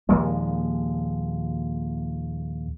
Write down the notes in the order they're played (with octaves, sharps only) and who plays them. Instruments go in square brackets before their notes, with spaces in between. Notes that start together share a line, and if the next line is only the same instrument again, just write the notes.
[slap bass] D#2 A#2 F3 G#3